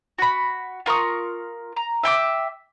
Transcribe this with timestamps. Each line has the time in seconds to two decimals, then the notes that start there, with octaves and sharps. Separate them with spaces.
0.19 F#4 B5
0.86 F4 A#4 C#6 D#6
1.76 A#5
2.04 E5 G5 C6 D6